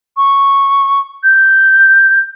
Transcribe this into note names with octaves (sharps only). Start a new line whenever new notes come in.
C#6
G6